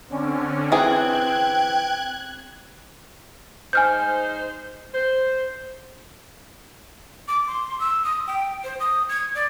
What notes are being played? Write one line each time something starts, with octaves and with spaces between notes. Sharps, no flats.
D3 C4 C#4
E3 G#4 G5 F#6 G#6
G#3 D#4 C5 G#5 F6 G6
C5
D6
C6
E6
D#6
G5
C5
D#6
G#6
D5